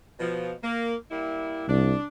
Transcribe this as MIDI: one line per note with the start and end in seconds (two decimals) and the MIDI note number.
0.19 0.52 47
0.19 0.52 53
0.63 0.94 58
1.10 1.64 55
1.10 1.64 58
1.10 1.64 64
1.68 1.94 36
1.68 2.05 62